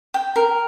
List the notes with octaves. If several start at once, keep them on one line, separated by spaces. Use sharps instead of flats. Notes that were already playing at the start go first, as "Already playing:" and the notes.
G5
A#4